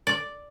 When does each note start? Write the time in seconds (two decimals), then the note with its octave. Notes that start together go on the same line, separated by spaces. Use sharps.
0.07 D5